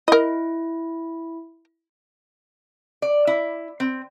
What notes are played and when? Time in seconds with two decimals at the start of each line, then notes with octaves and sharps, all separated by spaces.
0.08 E4 A#4 D#5
3.02 D5
3.27 E4
3.80 C4